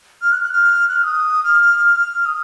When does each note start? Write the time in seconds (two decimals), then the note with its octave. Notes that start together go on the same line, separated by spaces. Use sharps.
0.22 F6
0.32 F#6
0.43 F#6
0.52 F6
0.89 F#6
0.96 F6
1.03 D#6
1.44 F6
2.26 D#6